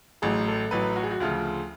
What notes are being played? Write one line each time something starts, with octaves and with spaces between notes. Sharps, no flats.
A1 A2 F#3 G#4
A4
A1 A2 F#3 B4
F#4
G#4
F#4
D2 C#3 F3 F4